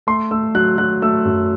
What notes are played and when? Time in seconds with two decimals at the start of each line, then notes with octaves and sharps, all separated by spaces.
0.07 A3 C6
0.31 A3 E6
0.55 F#3 F#6
0.78 F#3 F#6
1.02 A3 E6
1.25 F#2